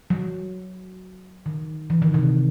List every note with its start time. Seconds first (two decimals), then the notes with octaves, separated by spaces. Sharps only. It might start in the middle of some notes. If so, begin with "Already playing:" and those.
0.10 F#3
1.46 D#3
1.90 E3
2.02 D#3
2.14 C3